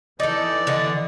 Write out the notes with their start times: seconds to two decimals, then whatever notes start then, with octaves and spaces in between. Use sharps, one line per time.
0.20 E3 D#4 A4 D5
0.67 D3 D#5